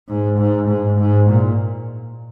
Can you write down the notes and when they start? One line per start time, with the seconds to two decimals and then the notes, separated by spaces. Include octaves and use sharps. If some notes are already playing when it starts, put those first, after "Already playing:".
0.09 G#2
0.38 G#2
0.68 G#2
0.98 G#2
1.29 A#2